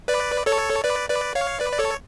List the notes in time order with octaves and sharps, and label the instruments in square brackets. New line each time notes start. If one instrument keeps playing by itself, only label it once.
[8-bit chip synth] B4 D5
A4 C#5
B4 D5
B4 D5
C#5 F5
B4 D5
D5
A4 C#5